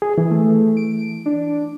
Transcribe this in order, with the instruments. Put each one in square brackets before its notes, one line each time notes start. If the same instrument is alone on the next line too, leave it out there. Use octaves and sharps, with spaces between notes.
[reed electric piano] G#4
E3
[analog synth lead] A3
D7
D4